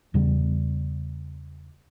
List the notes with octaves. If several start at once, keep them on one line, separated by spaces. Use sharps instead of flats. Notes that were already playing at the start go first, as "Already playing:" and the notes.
E2 C#3 G3